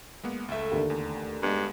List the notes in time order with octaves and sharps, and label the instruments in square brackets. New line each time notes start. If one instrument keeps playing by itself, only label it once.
[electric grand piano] G#3 A#3 B3
[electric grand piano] C#2 E5 [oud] A3 F5
[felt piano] D#2 D3
[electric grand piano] E2
[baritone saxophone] G2 [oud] D#3 F#4 D#5 [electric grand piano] G#3 B3